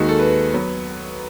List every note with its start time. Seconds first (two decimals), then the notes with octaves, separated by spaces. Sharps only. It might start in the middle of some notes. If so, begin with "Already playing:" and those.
Already playing: D#2 D#3 G#3 D#4 F#4
0.09 A4
0.19 B4
0.54 F#3 B3